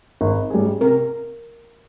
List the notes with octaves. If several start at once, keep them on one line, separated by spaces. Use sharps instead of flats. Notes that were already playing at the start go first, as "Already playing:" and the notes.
G#1
G#2 G3 C#4 G#4
C3 A#4